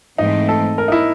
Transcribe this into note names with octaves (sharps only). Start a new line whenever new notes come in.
G#2 E3 A3 C4 D#4
A4
A#4
D#4
E4